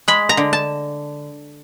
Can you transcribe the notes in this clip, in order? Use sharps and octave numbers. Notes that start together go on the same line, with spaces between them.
G#3 B5
A#5
D3
A5